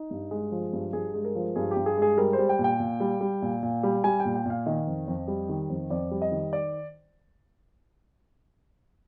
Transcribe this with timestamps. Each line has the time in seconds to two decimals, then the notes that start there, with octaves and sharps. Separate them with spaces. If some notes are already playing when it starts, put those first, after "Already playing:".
Already playing: D#4
0.11 G2
0.31 G#3
0.52 F3
0.73 G2
0.93 G2 G#4
1.14 G#3
1.25 A#4
1.35 F3
1.56 G2 G#4
1.71 G4
1.77 G2
1.86 G#4
1.97 G#3 G#4
2.18 G3 A#4
2.33 G3 C5
2.49 G5
2.59 A#2
2.64 G5
2.80 A#2
3.00 G3
3.21 G3
3.42 A#2
3.63 A#2
3.83 G3
4.04 G3 G#5
4.20 G5
4.25 A#2
4.35 G5
4.46 A#2 F5
4.66 D#3 D#5
4.87 F2
5.08 F2
5.28 G3
5.49 D#3
5.70 F2
5.90 F2 D5
6.11 G3
6.22 D#5
6.32 D#3
6.53 D5